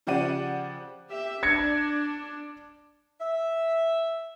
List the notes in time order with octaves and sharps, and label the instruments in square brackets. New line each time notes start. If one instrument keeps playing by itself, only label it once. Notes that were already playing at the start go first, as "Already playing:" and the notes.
[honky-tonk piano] C#3 F3 G4 D5 F#5 D#7
[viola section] G4 E5
[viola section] D4 [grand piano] G#6 A#6 C#7
[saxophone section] E5